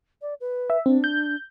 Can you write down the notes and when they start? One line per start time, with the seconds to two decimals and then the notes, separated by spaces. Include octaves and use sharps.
0.22 D5
0.40 B4
0.70 E5
0.86 C4 D4
1.04 G6